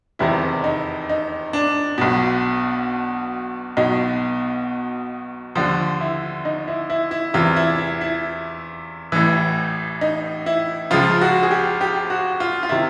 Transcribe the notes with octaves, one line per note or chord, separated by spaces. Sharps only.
F1 E2 C3 D#3 E4
D#4
D#4
D4
B1 B2
B1 B2 D#4
D#2 D3 F3
E4
D#4
E4
E4
E4
E2 C3 E3 F4
E4
E4
E4
A1 A2 E3
D#4
E4
C#2 C#3 F3 F4
F#4
G#4
G4
G4
F#4
F4
F4
C3 D#3 E4